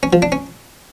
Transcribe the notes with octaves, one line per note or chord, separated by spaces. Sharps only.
C#4
F3
D4
C#4